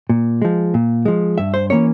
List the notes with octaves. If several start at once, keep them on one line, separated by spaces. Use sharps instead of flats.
A#2
F3 G#3
A#2
F3 G#3
G2 E5
C5
E3 A#3 C#4 C#5